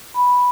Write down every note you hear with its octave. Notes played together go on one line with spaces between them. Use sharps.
B5